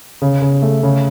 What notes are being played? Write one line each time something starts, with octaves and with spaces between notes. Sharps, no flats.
C#3
C#3
A3
C#3